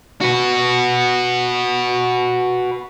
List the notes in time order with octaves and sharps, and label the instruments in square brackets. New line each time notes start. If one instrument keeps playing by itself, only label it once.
[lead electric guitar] F#4 B4